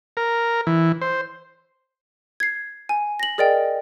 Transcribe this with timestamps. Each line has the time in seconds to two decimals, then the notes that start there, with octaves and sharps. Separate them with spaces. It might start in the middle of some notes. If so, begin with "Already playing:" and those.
0.17 A#4
0.67 E3
1.01 C5
2.40 G#6 C7
2.89 G#5
3.20 A#6 F#7
3.38 G#4 A#4 D5 D#5 G5